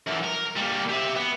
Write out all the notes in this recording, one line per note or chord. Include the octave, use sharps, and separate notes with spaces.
F#2 E3
A#4
G3 A#3
G4 E5
B3